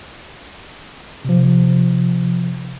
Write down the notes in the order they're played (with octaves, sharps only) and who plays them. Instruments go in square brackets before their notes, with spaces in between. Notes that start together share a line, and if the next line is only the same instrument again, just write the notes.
[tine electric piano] C3 F3